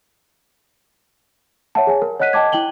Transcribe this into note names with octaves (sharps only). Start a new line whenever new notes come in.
C#5 E5 F#5 A5
G#4 C#5 G#5
A#4
C#5 D#5 F#5 F#6 B6 D#7
D#5 G5 A5 D6 G#6
E4 G5 F#7 G7